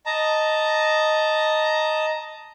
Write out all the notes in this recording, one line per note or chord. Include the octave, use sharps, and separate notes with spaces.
D#5 A5 A#5